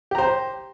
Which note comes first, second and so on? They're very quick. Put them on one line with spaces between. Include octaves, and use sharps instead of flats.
G4 A#5 C5